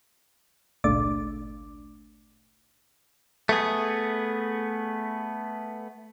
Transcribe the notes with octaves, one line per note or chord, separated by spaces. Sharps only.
G#1 C#2 A#2 A3 D4 D6
A3 B3 G#4